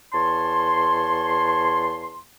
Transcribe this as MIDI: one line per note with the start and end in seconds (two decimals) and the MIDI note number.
0.13 2.18 40
0.13 2.18 73
0.13 2.18 81
0.13 2.18 84